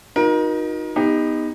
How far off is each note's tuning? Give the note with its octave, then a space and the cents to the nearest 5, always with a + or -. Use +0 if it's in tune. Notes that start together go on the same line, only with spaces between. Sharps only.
D#4 +0 F#4 -40 A#4 +30
B3 +0 D#4 +0 G4 +30